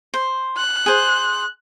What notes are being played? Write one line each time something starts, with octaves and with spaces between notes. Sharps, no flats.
C5
F#6
G#4 C5